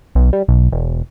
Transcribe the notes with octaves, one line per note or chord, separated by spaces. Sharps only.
B1
G3
B1
E1